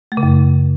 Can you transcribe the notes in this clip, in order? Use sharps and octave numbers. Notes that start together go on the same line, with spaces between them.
A3
C#3
F#2